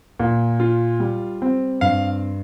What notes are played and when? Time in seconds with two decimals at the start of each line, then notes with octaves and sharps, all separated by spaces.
0.20 A#2
0.60 F4
1.00 G3
1.42 C4
1.81 G2 F5